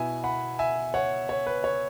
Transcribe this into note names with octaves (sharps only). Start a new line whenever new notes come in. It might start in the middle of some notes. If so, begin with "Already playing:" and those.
Already playing: B2 B3 E4 E5 G#5
F#5 B5
E5 G#5
C#5 F#5
C#5
B4
C#5